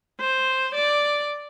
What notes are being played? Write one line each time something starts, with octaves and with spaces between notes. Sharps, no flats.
C5
D5